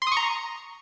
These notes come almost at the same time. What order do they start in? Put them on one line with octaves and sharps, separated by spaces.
C6 D#6 C#6 A#5